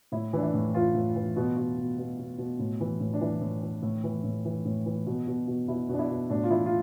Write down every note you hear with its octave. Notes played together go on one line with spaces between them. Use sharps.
A2 E4
E3 D4
E4
A2
E3 F4
A2
E3
B2
B2
B2
B2
B2
B2
A2
E3
A2
D4
E3 E4
A2
E3
A2
E3
A2
E3
A2
E3
B2
B2
B2
B2 E4
B2 D4
E4
B2
A2 D4
F4
E3 E4
F4